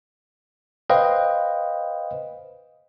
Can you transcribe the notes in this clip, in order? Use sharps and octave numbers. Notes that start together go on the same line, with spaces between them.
B4 C5 D#5 F5 G5